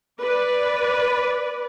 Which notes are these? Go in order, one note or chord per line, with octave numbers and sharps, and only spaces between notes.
B4 D5